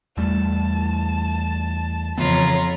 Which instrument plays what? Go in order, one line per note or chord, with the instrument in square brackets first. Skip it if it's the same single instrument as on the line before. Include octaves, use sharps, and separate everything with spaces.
[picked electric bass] E2 G3 A3 [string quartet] A5
[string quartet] F2 F4 C#5 [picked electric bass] C#3 E3 B3 [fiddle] A#5 B5